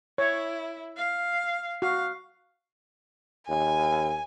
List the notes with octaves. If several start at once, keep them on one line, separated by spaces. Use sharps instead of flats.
E4 C#5
F5
F#4 F5
D#2 G#5